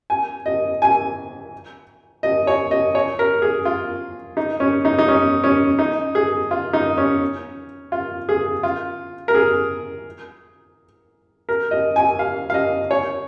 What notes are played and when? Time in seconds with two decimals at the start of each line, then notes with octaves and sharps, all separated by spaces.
0.10 G#5
0.46 D#5
0.82 G#5
2.23 D#5
2.47 C#5
2.71 D#5
2.95 C#5
3.19 A#4
3.42 G#4
3.65 F4
4.37 D#4
4.60 C#4
4.85 D#4
4.98 D#4
5.08 C#4
5.44 C#4
5.79 D#4
6.15 G#4
6.51 F4
6.73 D#4
6.98 C#4
7.92 F4
8.29 G#4
8.63 F4
9.28 A#4
9.35 G#4
11.49 A#4
11.71 D#5
11.96 G#5
12.19 F5
12.50 F5
12.54 D#5
12.91 C#5